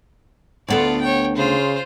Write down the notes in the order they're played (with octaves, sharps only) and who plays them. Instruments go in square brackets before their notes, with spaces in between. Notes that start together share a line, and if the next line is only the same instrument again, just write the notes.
[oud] D2 B3 A4 [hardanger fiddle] F4 D5
[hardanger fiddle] C#5 G5
[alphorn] C#3 [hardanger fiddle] F4 C5